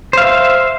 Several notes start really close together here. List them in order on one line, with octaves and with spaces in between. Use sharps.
C5 F5 E5